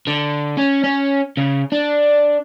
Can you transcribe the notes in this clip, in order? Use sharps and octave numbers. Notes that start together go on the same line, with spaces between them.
D3
C#4
C#4
C#3
D4